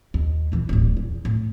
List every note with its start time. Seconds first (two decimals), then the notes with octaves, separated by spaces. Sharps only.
0.14 D#2
0.52 A#2 E3
0.69 D1 A1
0.97 E2
1.25 A2